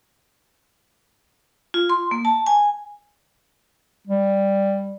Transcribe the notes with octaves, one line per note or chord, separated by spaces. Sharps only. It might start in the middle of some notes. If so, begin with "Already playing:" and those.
F4
C6
A#3
A5
G#5
G3